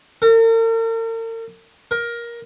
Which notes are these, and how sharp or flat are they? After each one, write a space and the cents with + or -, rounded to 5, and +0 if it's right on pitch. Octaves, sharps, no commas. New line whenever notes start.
A#4 -45
A#4 +15